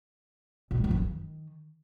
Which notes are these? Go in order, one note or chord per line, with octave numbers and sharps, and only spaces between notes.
B2
G#3
F3
F#2
D#3